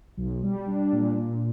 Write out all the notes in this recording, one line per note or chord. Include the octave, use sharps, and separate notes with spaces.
B1
G3
D4
A#2
A#2